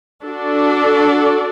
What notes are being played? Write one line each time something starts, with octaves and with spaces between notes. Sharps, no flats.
D4 F#4 A4 D5